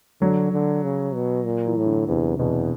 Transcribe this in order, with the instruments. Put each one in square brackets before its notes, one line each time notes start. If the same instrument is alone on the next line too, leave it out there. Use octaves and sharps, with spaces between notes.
[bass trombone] D3 [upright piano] F#3
[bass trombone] D3
C#3
B2
A#2
[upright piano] E3
[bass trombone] A2
[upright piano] D3
[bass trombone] E2 [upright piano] C3
[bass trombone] E2 [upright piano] B2